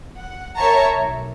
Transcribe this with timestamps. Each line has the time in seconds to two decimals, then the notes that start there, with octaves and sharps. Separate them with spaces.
0.17 F#5
0.56 A#4 C#5 E5 A5 A#5 C#6
0.96 B1